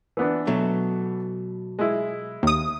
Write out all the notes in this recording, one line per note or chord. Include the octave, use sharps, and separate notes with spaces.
E3 B3 D4
B2 F#3 A3
G#3 E4
D#2 D#6